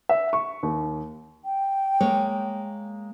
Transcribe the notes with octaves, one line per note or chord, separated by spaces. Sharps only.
E5
C#6
D#2
G5
G#3 A#3 C#5